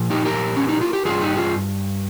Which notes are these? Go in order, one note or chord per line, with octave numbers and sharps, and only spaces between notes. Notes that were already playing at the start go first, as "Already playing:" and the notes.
Already playing: A#2 F3
D#4 G4
G4 A#4
C#4
D#4
F4
G4
G2 F3 F4 G#4
D#4 G4
F4 G#4